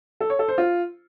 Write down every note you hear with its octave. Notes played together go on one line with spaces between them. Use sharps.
A4
C#5
A4
C5
F4